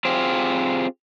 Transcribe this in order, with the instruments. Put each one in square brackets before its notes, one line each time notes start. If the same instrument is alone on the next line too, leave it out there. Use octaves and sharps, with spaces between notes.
[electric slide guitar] C4 F4 G4 G#4 C5